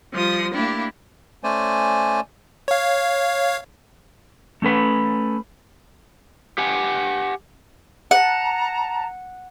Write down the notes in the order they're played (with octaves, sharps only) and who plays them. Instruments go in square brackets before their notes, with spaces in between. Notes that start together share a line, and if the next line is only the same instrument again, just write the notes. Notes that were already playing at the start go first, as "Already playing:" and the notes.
[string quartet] F3 G3 C6 D#6
A3 A#3 D4 E4 G4
[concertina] A3 C#4 C5 D5 G#5
[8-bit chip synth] C#5 F5
[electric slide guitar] A3 C#4 A4 B4
G4 F#5 G#5
[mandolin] F#5 [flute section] A5 A#5